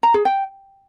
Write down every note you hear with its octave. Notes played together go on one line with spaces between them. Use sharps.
A#5
G#4
G5